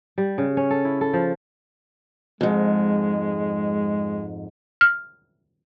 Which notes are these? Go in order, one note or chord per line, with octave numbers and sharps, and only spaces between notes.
G3
C#3
C#4
A4
E4
A4
F3
F2 G#2 G#3
F6